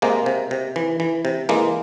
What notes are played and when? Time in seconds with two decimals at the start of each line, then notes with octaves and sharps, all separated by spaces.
0.02 C3 G#3 A#3
0.26 C3
0.51 C3
0.76 E3
1.00 E3
1.25 C3
1.49 E3 G#3 A#3